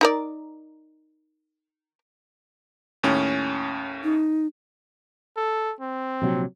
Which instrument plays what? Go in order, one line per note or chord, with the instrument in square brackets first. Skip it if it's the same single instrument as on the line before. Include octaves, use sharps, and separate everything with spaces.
[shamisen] D#4 A#4 D5
[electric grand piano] D#2 A2 C#4
[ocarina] D#4
[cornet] A4
C4
[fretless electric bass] A#1 C3 F#3